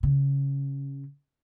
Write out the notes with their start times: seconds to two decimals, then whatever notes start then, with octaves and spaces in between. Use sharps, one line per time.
0.03 C#3